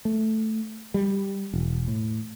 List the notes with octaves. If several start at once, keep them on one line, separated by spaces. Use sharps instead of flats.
A3
G3
E1
A2